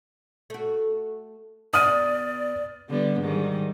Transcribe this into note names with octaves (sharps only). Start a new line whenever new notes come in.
A3 F#4
B2 B3 D5 D#6 F6 D#7
D3 G3 B3
G#2 D#3 G3